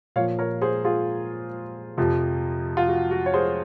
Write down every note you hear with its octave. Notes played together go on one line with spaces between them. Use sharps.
A#2 F3 C#5 F5
A#4 C#5
G#4 C5
F4 G#4
F2 C3 F3
F4
F#4
F#4
C#5
G#4 C5